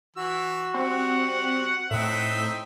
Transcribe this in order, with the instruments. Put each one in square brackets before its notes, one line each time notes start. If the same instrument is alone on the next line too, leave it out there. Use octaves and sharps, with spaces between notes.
[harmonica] E3 E6 [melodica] F#4
[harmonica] G3 [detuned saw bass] C4 [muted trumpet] F#5
[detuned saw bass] A2 [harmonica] C4 D#4 E5